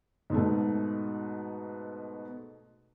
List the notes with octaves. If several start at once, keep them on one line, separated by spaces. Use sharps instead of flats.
G#2 B2 A3